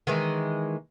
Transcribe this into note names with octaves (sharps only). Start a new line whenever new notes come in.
D#3 E3 G#3